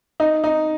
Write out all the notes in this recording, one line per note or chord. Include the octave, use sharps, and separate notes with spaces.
D#4
D#4